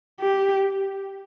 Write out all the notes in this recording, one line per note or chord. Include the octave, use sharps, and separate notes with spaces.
G4